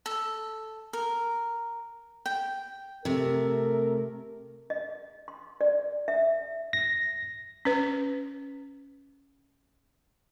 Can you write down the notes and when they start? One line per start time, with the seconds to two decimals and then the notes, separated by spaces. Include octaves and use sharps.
0.06 A4
0.93 A#4
2.26 G5
3.05 C3 A3 A#4
4.70 D#5
5.28 C6
5.61 D5
6.08 E5
6.73 A#6
7.65 C#4 B4